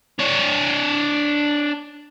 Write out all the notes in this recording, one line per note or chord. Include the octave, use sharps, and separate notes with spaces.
D4 C#5